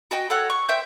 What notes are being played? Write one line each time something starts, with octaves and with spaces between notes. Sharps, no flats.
F#4 D#5 G5
A4 C#5 F#5 F#6
C#6
C5 E5 G5 G6